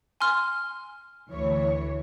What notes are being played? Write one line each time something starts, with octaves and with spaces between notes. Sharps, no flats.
G#5 C6 F6
D2 E3 C#5